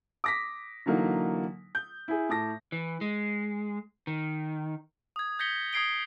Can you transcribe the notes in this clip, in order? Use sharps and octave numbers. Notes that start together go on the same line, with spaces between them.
D6 A#6 B6
D3 E3 F#3 A#3 D#4
G6
E4 G#4
A2 A5 D6 A#6
E3
G#3
D#3
D#6 G#6
G6 G#6 A#6 B6 C#7 G7
D#6 G#6 C7 D7 G7